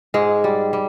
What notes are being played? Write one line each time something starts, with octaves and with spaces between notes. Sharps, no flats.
G#2 G#3
G3
G3